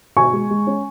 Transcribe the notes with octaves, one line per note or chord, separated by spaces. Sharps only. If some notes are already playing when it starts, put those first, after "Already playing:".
B2 G#5 C#6
G#3
G#3
C#4